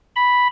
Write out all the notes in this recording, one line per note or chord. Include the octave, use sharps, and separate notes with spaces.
B5